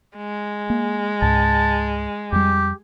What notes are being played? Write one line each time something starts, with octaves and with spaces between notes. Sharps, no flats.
G#3
A#3
C#2 G#2 A5
F2 G3 G4